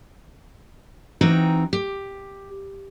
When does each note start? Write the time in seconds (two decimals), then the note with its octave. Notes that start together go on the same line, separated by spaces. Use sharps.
1.21 E3 C4 D#4 F#4 G5 A#5
1.73 G4